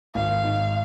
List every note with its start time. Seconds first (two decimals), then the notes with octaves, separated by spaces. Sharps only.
0.15 G#1 F5
0.44 G#2